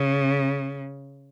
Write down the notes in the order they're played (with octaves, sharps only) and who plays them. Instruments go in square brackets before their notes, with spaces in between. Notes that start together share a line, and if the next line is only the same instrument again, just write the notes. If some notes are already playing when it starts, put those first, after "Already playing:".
Already playing: [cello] C#3